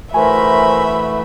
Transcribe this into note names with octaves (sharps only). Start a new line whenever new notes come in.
E3 A3 F#4 A#4 C5 E5 G#5 B5